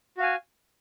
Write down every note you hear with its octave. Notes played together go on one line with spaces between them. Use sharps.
F#4 F5 G#5